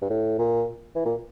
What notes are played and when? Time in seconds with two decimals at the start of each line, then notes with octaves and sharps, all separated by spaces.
0.02 G2
0.10 A2
0.39 A#2
0.96 E3
1.06 A#2